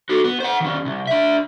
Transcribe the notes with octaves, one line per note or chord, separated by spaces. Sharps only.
F#4 A4
B3
C5 F#5
D#3 C#4
C2
D4 E5